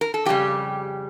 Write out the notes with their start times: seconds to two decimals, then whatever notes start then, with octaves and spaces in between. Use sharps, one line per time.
0.01 A#4
0.14 A4
0.25 F2 C#3 G3 G4